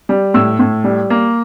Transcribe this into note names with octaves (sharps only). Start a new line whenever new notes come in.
G3
A2 E6
A2
G3
A#3